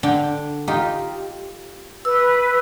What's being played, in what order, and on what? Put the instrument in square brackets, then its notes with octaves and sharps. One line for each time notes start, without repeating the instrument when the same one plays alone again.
[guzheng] D3 D4 G5
D#4 F4 G4
[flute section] B4 [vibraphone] E6